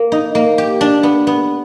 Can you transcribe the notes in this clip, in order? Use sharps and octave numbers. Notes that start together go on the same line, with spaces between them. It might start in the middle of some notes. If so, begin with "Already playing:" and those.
Already playing: A#3
D#4
A#3
G4
D4
B3
B3